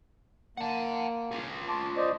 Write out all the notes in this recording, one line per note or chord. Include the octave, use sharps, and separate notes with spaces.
A#3 F#5 A5
F4 G#4
A5 C6 D6
C5 D5 D#5